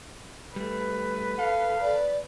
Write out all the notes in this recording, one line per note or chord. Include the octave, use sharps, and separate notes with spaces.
G3 A3 B4
A4 F5
D5